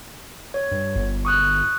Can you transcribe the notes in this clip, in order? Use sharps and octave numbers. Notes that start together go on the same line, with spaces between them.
C#5
G2
G1
C#6 D#6 F#6